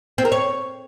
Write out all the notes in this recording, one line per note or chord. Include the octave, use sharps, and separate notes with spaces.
C4
A#4
C#5